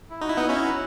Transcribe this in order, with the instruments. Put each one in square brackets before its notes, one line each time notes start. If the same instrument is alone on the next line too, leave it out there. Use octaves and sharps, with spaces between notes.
[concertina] E4
[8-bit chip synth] D#4 [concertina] F#4
[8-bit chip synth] E4
B3 D#4
C#4 E4